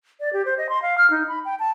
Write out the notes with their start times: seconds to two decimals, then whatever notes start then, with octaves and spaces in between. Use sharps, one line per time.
0.20 D5
0.33 G4
0.45 C5
0.58 D#5
0.69 C6
0.82 F5
0.98 F6
1.11 D#4
1.28 B5
1.45 G5
1.59 A5